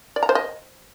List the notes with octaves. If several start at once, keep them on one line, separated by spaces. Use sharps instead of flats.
D5
A#5
C5
D#5